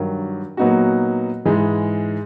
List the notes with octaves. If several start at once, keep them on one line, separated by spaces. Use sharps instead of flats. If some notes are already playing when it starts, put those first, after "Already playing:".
Already playing: G2 D#3 F#3
A#2 F#3 B3 D#4 F#4
G#2 E3 G#3